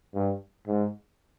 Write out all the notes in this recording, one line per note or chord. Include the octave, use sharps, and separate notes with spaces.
G2
G#2